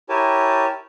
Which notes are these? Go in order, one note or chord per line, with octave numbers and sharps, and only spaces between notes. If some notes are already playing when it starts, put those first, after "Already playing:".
E4 G4 A#4 C#5 G#5 A5